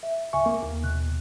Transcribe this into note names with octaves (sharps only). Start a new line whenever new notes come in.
E5
C#2 E5 G#5 C#6
A#3
D#2
B2 F#6